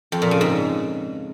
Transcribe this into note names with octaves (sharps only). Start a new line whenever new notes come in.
F2
A#2
C#3
G#2